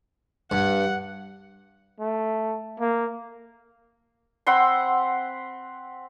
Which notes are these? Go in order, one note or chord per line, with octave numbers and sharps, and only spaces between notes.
G2 F#5
A3
A#3
C4 F#5 B5 C6